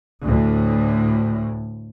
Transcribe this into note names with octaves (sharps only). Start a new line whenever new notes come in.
D2 A2